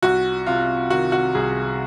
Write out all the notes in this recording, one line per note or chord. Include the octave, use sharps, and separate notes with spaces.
C2 F#4
C3 F4
D#3 F#4
F#4
C2 G#4